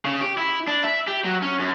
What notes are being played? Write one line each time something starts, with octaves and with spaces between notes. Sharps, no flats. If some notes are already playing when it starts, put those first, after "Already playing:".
C#3
G4
E4
D4
E5
G4
F#3
C#4
F#2